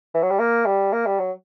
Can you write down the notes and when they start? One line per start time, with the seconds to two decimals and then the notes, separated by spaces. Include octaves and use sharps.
0.14 E3
0.23 F#3
0.31 G3
0.39 A#3
0.66 G3
0.93 A#3
1.06 G3
1.19 F#3